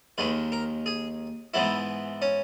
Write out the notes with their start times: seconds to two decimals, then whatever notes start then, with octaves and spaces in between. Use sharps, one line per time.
0.18 D#2 D#3 G#3 B4
0.52 A#4
0.86 G#4
1.54 G#2 E3 G#3 B3 E4
2.22 C#4